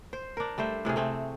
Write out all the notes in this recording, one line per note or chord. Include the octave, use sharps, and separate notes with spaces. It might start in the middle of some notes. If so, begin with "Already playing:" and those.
C5
D4 A#4
G3 A3 C5 E5
A2 C3 C#4 G#4
A3 C4 G#4